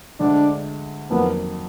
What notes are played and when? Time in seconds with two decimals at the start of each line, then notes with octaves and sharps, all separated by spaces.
0.20 D2 D3 G#3 D4
1.10 F2 D#3 F#3 A#3 B3